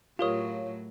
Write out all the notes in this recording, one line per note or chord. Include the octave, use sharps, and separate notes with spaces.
A2 F#3 F4 G4 A#4 C#5 D#6